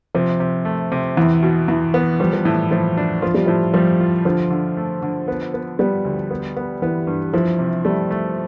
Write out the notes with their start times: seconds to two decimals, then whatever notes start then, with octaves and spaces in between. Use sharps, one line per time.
0.15 C3 F3
0.40 C3
0.65 A3
0.92 C3
1.17 E2 E3
1.43 B2
1.68 E2 E3
1.94 B3
2.20 F3 G3
2.33 F3
2.45 A2 E3
2.71 A2 F3
2.97 D4
3.22 F3 F4
3.34 G3
3.46 A2 F3
3.74 F3 G3
4.00 F4
4.25 D3 F3
4.50 D3
4.77 A3
5.03 D3
5.28 B3
5.54 B3
5.79 G3 B3
6.05 D2
6.31 B3
6.56 B3
6.82 E3 B3
7.07 G2
7.33 F3 E4
7.59 C3
7.85 G3 A3
8.11 A3